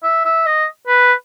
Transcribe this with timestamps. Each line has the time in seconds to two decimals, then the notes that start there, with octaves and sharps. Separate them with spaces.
0.03 E5
0.25 E5
0.46 D#5
0.87 B4